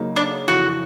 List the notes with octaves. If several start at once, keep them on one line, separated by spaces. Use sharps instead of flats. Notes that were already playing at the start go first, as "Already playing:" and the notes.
Already playing: C#3 F#3 A#3 D#4
D4
F2 C#3 E3 F#4